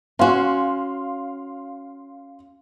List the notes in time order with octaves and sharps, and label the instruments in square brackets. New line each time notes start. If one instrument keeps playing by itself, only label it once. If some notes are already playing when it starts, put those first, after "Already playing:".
[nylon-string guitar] C#4 F#4 [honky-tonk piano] F5 C6